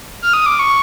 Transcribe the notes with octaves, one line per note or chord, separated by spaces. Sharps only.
F6
D#6
D6
C#6